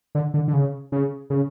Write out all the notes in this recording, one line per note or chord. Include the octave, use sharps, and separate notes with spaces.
D3
D3
D3
C#3
C#3
C#3